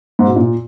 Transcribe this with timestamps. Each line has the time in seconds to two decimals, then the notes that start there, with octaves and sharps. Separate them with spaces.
0.19 G#2
0.27 B2
0.36 A#2